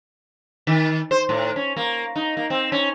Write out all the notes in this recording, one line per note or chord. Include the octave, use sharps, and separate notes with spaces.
D#3
C5
A2
C#4
A#3
D#4
A#3
C4
C#4